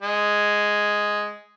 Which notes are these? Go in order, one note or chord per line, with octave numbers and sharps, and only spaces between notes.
G#3